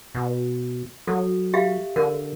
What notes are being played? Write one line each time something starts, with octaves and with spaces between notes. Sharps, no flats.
B2
F#3 A4
G4 E5 F5
D3 A#4